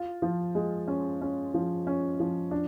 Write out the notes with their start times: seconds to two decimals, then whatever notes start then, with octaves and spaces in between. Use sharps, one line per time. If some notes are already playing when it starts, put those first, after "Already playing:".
Already playing: F4
0.22 F3
0.55 G#3
0.88 C#4
1.21 C#4
1.54 F3
1.87 C#4
2.20 F3
2.51 D4